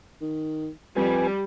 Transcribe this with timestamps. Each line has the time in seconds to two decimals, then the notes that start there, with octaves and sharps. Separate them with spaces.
0.21 D#3
0.96 F2 G3 B4 G#5